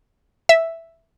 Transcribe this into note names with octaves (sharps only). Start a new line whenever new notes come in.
E5